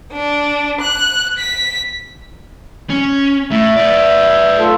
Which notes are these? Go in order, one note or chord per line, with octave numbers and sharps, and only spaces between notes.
D4
F#6
B6
C#4
A2 E5
B4 D5
A3 F4 A4